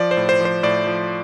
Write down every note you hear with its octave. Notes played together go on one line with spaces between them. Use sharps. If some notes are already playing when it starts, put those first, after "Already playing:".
Already playing: F3 D5
C5
A2
C5
F3 C5
A2 D5
F3